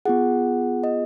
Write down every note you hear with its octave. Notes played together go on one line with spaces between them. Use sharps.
B3 F4 G#4 F#5
D#5